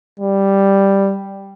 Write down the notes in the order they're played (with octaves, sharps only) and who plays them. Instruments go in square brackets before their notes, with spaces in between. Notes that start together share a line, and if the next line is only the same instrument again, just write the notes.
[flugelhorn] G3